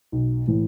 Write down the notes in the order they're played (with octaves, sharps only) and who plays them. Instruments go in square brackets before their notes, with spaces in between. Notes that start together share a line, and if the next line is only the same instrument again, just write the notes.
[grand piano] B1
A2 E3